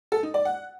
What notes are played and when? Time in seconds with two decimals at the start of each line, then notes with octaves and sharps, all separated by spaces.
0.12 A4
0.23 D#4
0.34 D5
0.45 F#5